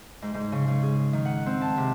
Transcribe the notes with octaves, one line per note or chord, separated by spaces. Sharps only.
G#2
G#2
C#3
C#3
G#4
D#3
F#5
C4
A5
C3